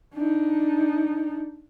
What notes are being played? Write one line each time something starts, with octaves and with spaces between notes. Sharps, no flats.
D4 D#4